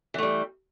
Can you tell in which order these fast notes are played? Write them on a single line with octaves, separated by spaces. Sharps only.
E3 A3 G3